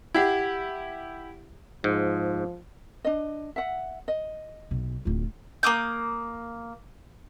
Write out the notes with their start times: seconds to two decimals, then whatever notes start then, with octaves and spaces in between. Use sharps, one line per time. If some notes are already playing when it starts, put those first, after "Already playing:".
0.14 E4 G4 F#5 G#6
1.84 G#2 F3
3.05 D4 D#5
3.56 E5 F#5
4.08 D#5
4.71 B1
5.05 D1 F4
5.63 A#3 D6 D#6 G6